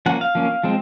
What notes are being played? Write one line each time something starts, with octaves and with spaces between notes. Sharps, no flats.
F3 A#3 C#4 F#5
F5
F3 A#3 C#4
F3 G#3 C4